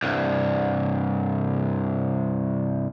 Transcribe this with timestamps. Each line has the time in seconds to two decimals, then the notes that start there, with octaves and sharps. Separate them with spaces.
0.03 C2 G2